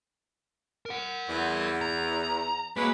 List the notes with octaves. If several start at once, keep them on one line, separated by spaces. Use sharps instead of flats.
A#4 F#5
E2
A#5
F#3 G#3 A#3 B4